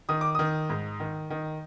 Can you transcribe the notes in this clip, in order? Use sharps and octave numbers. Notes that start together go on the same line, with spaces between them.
D#3 D#6
D6
D#3 D#6
G#2
D#3
D#3